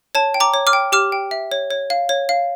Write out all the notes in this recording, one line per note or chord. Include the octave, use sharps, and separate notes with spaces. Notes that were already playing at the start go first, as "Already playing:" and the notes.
C#5 A5
G5
A#5 D6
C#5
D6 F6
G5
G4 D6 F6
G5
E5
C#5
C#5
F5
C#5
F5